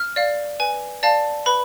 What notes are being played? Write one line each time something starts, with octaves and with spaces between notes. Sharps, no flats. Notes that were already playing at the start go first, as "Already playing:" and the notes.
Already playing: F6
D5 F5
B4 G#5
D5 F5 A5
B4 B5